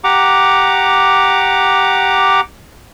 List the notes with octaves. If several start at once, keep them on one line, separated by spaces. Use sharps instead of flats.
G4 F#5 A#5 D6